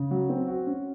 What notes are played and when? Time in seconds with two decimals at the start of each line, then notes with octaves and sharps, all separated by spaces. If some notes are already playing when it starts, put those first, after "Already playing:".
Already playing: C#3
0.11 F#3
0.29 C4
0.48 F#4
0.67 C#4